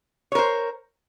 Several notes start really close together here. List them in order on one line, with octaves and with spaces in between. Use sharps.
C#5 A#4 C5